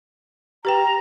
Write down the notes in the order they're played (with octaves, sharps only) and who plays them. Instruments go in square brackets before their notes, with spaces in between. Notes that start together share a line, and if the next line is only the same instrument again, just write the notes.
[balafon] G4 B4 G5 [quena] A#5